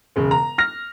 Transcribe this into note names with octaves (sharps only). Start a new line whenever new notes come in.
E1 C#3
A#5
F6 A#6